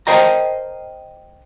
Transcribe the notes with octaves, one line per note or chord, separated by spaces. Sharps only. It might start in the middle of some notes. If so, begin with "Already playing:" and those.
A#4 C5 D#5 G5 A5 A#5